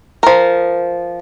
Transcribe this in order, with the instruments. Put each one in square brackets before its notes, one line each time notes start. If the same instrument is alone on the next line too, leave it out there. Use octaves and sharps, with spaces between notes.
[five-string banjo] F3 A#4